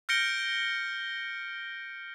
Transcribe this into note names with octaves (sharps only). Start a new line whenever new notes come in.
F6 G6 A#6 C#7 D7 G7